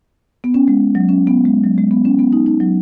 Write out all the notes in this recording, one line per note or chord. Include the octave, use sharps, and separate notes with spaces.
B3
C#4
G#3
F#3
C#4
B3
G#3
F#3
G#3
B3
C#4
B3
D#4
D#4
F#3